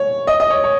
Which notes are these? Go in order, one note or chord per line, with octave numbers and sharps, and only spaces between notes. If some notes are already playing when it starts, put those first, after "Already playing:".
Already playing: C#5
D#5
D#5
C#5
C#5